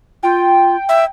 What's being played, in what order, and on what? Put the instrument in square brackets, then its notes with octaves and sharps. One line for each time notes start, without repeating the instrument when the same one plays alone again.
[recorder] F4 [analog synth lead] G5
[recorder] E5